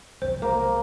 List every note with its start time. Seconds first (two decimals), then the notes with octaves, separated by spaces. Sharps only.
0.22 C2 F3 C5
0.42 A#3